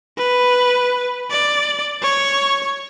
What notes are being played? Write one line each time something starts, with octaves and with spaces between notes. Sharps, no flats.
B4
D5
C#5